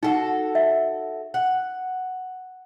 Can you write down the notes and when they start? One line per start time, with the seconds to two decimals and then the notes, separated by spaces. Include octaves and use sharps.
0.03 D#4 F#4 A4 F#5
0.55 E5
1.34 F#5